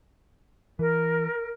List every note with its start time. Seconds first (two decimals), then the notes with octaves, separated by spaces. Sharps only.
0.79 E3 A#4